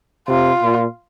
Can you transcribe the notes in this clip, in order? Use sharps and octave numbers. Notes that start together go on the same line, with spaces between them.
C3 F4
A#2